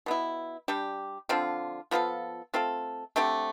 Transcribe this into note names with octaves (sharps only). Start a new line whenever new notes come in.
B2 B3 E4
G3 D4 G4
D3 F3 C4 F4
F3 B3 F4 A4
A3 C4 F4 A4
D3 A3 C4 G4